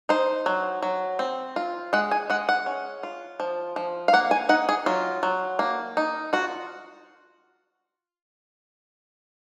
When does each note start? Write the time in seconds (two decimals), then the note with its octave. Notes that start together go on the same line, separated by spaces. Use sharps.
0.09 D#4 C5
0.46 F#3
0.82 F#3
1.19 C4
1.56 F4
1.93 G#3 F#5
2.11 G#5
2.30 G#3 F#5
2.49 F#5
2.66 C#4
3.03 F4
3.40 F3
3.76 F3
4.08 F5
4.13 A#3 F#5
4.31 G#5
4.49 D#4 F#5
4.69 G#4
4.86 F#3 F4
5.23 F#3
5.59 A#3
5.97 D#4
6.33 F4 F#4